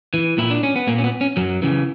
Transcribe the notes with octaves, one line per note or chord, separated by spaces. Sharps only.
E3
A#2 E4
D4
C#4
B3
A#2 A#3
C#4
B3
C#4
F#2 F#3
C#3 E3